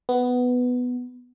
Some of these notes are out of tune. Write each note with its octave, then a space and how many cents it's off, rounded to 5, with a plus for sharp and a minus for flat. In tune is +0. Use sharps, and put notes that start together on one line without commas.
B3 +5